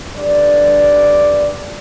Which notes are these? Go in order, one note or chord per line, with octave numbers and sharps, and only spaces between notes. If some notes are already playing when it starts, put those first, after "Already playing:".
G2 D3 G3 D5